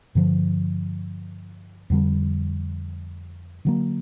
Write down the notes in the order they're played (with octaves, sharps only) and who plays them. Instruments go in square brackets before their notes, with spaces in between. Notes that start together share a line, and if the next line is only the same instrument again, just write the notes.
[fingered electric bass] G2 D3 F3
F2 D3 G3
D3 F#3 A#3